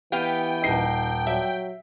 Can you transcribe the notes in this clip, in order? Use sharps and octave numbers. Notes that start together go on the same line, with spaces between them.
E3 B3 G4 F5 G5
D#1 D#4 C7
F#3 E5